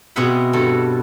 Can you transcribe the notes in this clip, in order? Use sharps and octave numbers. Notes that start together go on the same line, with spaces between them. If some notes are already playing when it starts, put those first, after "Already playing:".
B2 C4 G#4 E5 F#5 B5
G2 F#4 A4